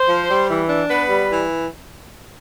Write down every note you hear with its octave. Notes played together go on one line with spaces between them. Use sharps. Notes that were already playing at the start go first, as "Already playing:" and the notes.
Already playing: C5
F3
G3
E3
D4
B3 B4
G3
E3